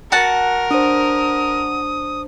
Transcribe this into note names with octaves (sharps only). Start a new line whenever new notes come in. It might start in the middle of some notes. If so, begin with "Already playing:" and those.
F#4 A#4 F#5 A5
D4 C5 D#6